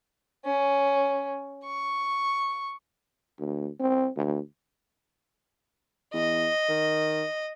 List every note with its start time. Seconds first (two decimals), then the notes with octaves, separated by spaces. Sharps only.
0.45 C#4
1.64 C#6
3.39 D2
3.80 C4
4.16 D2
6.14 E2 D#5
6.69 D#3